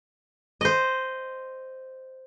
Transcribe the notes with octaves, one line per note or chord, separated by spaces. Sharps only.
C5 D#5